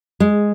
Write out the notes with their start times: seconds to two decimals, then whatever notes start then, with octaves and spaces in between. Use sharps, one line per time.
0.20 G#3